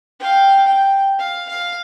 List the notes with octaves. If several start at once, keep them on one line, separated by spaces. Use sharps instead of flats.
F5 G5
G5
F5
F5